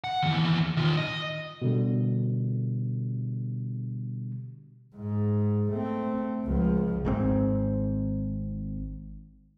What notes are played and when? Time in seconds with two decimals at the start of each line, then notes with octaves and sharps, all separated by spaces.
0.04 F#5
0.23 D#2 E3
0.77 D#3 F4
0.97 D#5
1.62 B2 D3 G3
4.96 G#2
5.71 A3 C4
6.46 C#2 F3
7.05 G#1 G#2 C3 C4